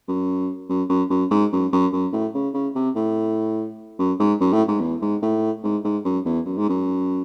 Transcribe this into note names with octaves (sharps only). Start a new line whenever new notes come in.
F#2
F#2
F#2
F#2
G#2
F#2
F#2
F#2
A2
C#3
C#3
C3
A2
F#2
G#2
F#2
A2
G#2
E2
G#2
A2
G#2
G#2
F#2
E2
F#2
G#2
F#2